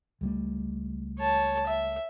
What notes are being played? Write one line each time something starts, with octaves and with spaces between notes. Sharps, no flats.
C#2 G3 A3
C#5 A5
E5